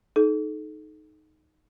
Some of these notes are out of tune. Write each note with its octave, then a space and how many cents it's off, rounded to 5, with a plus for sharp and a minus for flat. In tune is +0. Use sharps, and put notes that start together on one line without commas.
D#4 +0 A4 -35